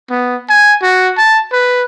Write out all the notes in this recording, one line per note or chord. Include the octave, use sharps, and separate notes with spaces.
B3
G#5
F#4
A5
B4